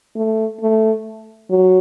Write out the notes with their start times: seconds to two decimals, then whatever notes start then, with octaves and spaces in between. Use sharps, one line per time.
0.16 A3
0.61 A3
1.50 F#3